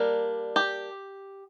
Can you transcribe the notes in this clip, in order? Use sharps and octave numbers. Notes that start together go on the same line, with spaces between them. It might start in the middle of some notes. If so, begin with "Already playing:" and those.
Already playing: G3 A#3 D4 A#4
G4